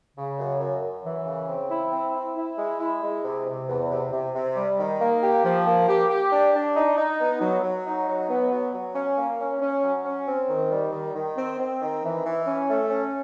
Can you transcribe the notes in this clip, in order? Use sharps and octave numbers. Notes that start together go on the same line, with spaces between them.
C#3
F#2
F#2
F#2
E3
C#3
C4
E4
C4
E4
E4
G#3
E4
G#3
C3
C3
E2
C3
C3
C3
G3
D#3
A#3
G4
F3
A#3
G4
G4
D4
D4
D#4
D#4
B3
F#3
F#3
D#4
F#3
B3
F#3
F#3
C#4
A#3
C#4
C#4
F#3
C#4
C4
D#3
G3
D#3
D#3
C4
C4
D#3
E3
E3
C#4
A3
C#4